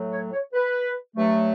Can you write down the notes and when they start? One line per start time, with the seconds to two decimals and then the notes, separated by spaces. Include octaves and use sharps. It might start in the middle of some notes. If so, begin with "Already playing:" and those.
Already playing: A2 F#3 A3
0.12 C#5
0.33 C#5
0.53 B4
1.16 G2 F#3 A3